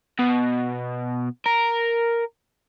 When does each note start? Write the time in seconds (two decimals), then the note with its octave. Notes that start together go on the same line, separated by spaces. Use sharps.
0.19 B2
1.46 A#4